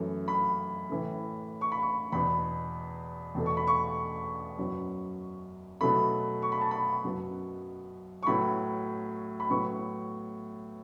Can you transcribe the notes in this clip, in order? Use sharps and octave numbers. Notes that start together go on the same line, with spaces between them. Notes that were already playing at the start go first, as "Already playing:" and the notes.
Already playing: F#2 E3 A3
B5
A2 E3 A3
C#6
B5
C#6
E2 B2 B3 B5
E2 B2 A3
C#6
B5
C#6
F#2 F#3 B3
B2 F#3 A3 B5
C#6
B5
A5
B5
F#2 F#3 B3
C#6
A2 F#3 B3 B5
B5
A2 F#3 B3 C#6